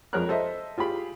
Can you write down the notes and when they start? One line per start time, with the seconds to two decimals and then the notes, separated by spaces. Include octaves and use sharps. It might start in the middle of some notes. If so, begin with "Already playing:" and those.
0.13 F2 G#3 A#4 C#5 F6 F#6
0.29 A4 C5 D#5 E5
0.78 F4 G4 G#4 B5